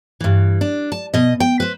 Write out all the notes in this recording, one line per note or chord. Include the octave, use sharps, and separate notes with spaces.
G2 E3
D4
A5
B2 D#5
G5
B4 C5